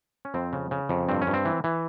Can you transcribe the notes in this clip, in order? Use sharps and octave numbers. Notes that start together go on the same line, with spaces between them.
C#4
F2 C4
C#3
C#3
F2
G2 C4
C#4
G2
C4
E3
E3